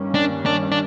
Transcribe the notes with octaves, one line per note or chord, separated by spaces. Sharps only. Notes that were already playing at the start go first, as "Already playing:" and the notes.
Already playing: G2 D#3 G3 A#3 C#4
D4
D4
D4